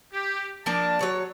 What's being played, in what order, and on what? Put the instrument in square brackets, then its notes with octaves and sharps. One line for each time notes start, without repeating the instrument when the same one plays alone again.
[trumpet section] G4
[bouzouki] F3 A#3 D4 [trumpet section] A5
[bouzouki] F#3 C#5